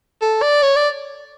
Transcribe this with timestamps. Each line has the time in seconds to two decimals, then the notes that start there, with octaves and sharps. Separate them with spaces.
0.22 A4
0.42 D5
0.62 C#5
0.76 D5